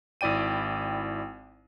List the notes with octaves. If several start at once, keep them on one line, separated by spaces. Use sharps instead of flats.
G#1 E4 D5 G5 D#7